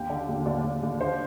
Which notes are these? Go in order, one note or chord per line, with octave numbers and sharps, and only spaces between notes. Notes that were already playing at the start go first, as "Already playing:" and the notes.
Already playing: D#2 G5
D3
D#2
D#2 D5
D#2
D#2
D3 C5